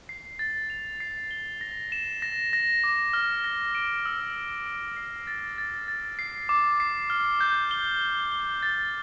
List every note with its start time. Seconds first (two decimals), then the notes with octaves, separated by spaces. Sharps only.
0.09 C7
0.39 A6
0.70 F7
1.00 C7
1.31 G7
1.61 A#6
1.92 E7
2.22 A#6
2.53 A#6
2.84 D6
3.13 F6
3.44 A#6
3.75 D7
4.06 E6
4.35 E6
4.66 D7
4.97 C7
5.27 A6
5.58 A6
5.88 A6
6.19 C7
6.49 D6
6.80 C7
7.10 F6
7.40 G6
7.71 G7
8.02 G7
8.32 G7
8.63 A6